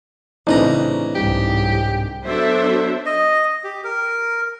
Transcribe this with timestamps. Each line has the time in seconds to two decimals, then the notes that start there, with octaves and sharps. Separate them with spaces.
0.47 A1 C#3 C4 D4 D#4 B4 A#5
1.15 C2 G#2 G4
2.24 F#3 B3 D4 A4 C5 E5
3.06 D#5
3.64 G4
3.84 A#4